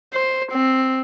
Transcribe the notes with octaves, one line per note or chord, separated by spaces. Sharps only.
C5
C4